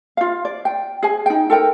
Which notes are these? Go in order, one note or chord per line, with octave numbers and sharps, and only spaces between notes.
F4 F5
D5
G5
G#4 G#5
D#4 G5
A4 A#4 G5